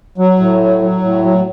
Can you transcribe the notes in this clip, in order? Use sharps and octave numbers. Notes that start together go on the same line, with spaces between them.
F#3
A2
F#3
F#3
A2
F#3